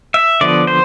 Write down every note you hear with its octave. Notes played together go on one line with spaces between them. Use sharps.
E5
D3 F3 B3 D5
C5